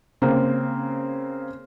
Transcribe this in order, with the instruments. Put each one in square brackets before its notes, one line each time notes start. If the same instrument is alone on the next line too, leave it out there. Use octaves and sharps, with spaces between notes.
[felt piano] C#3 A#3 C4